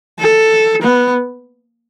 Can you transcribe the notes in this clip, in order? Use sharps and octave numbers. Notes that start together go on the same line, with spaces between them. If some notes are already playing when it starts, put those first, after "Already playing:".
A4
B3